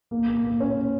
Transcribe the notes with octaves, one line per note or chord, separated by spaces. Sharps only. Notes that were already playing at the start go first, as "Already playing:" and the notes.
A#3
A#3
A#3
C#4